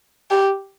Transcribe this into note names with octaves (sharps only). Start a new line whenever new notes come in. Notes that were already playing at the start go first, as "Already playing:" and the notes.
G4